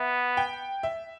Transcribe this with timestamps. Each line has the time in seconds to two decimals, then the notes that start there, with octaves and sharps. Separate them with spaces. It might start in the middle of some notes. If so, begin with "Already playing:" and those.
Already playing: B3 E5
0.37 G5
0.83 E5